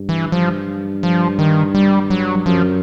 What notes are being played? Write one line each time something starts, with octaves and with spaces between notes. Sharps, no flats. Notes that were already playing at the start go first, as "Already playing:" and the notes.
Already playing: G2
E3
G2 F3
F3
D#3
G3
F#3
F#2 F3